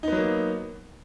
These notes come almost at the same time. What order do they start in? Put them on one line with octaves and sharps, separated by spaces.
D#4 B3 F#3 A#3